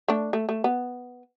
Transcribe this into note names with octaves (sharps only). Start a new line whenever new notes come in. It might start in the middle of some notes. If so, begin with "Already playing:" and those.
A3 D4
A3
A3
B3